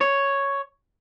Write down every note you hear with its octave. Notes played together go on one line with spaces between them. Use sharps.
C#5